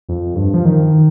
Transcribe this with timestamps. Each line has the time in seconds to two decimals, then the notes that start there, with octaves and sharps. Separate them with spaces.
0.09 F2
0.36 G2
0.54 F3
0.65 D#3